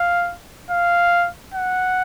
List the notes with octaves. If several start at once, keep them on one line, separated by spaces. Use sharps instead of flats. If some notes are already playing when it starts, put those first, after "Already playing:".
Already playing: F5
F5
F#5